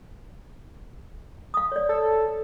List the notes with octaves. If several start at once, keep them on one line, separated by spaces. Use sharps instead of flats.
F5 D#6
C#5 D5
A4